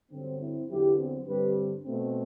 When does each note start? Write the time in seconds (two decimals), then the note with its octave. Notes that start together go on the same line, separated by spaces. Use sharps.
0.11 G2 D3 F#3 C4
0.40 C4 E4
0.69 E2 D3 F#3 B3 E4 G4
0.97 C4
1.26 G2 D3 G3 C4 G4 B4
1.84 B2 A3 C4